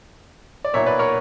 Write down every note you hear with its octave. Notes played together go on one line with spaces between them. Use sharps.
D5
B1 A#2 A#3 C#5 E5
B4 D5
A#4 C#5